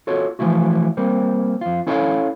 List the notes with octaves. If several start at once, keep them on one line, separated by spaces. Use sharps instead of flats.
F4 F#4 A4 C#5
E3 F3 A3 E4 F#4
G3 A#3 C4
F2 F4
C#4 E4 A4 C#5 D#5 F5